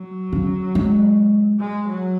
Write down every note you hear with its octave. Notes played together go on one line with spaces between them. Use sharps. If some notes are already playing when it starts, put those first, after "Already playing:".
Already playing: F#3
C#3
G#3
G#3
F#3